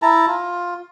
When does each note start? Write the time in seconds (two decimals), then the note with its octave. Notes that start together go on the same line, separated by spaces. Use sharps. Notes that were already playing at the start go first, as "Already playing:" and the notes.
0.02 E4 A5 A#5
0.27 F4